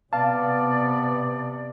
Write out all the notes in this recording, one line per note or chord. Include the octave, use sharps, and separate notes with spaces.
C3 B3 D5 F5 A5